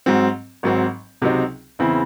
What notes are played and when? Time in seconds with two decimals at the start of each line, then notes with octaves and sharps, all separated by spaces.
0.06 G#2 F#3 C4
0.63 G#1 G#2 F#3 C4
1.22 C#2 C3 F#3 C4 D#4
1.79 E2 C#3 E3 C4 E4